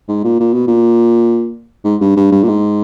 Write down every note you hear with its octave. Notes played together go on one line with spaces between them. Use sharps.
G#2
A#2
A#2
B2
A#2
G#2
G2
G2
G2
A#2
G#2